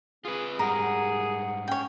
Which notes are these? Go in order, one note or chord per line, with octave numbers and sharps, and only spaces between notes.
C4 F4 G#4 B4
G#2 G3 G#4 A#4 F#5
F#5
C#4 C#5 G5